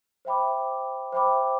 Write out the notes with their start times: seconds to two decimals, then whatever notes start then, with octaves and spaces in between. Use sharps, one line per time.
0.25 C5 E5 G5 B5 D6
1.12 C5 E5 G5 B5 D6